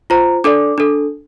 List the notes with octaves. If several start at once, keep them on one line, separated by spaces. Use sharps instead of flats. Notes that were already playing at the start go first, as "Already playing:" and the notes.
F4 C5 A#5
D4 A4 D5 D6
D4 A4